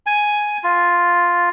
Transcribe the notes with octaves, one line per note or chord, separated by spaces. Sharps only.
G#5
F4